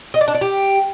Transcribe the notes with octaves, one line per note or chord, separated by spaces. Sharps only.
D#5
D5
D4
D5
G4